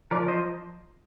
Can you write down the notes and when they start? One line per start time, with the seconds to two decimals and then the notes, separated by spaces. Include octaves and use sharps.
0.11 F3 A#4 D5
0.28 C5 D#5